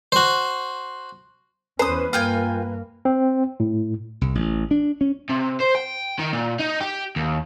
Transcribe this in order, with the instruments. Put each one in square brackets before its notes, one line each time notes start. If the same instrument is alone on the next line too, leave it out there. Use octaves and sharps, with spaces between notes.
[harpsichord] F#4 C5
[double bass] E2 C#4 [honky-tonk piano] B4 [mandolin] C5 D#6
[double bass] G2 A#3 [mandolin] F4 G5 G#5
[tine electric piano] C4
A2
[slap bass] C2
A1
D4
C#4
[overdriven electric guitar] C3
C5
G5
D#3
A#2
D#4
G4
D#2